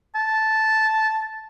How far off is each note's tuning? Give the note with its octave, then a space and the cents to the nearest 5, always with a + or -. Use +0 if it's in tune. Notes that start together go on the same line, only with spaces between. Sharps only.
A5 -5